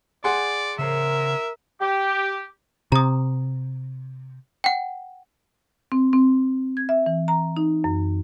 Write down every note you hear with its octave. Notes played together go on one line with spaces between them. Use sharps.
G#4 D5 F#5 C6
C#3 A#4 C5 C#5 E5
G4
C3 A#5 D#6
F#5 G5
C4
C4
G#6
E5
E3
A#5
D#4
F#2